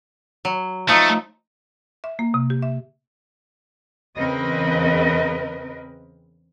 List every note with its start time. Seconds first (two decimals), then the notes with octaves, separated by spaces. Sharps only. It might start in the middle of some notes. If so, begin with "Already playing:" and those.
0.45 F#3
0.89 F3 A3 D#4
2.04 E5
2.19 A#3
2.34 C3
2.50 G4
2.62 E5
4.17 E2 C#3 C4 A#4 B4 D#5